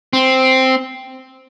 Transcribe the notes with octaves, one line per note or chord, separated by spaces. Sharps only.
C4